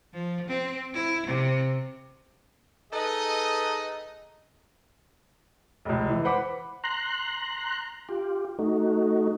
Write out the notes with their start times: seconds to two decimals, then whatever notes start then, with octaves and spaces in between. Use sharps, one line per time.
0.13 F3
0.48 C4
0.94 E4
1.26 C3
2.93 D#4 G#4 A4 B4 D#5
5.85 F1 C#2
6.09 E3
6.24 B4 C5 F#5 B5 D6
6.84 A#5 C6 F#6
8.09 F4 G4
8.59 A3 D#4 F#4